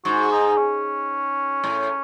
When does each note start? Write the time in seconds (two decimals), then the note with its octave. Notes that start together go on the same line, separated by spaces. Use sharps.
0.05 G#2 F#4
0.32 D#4
0.58 C#4
1.64 A2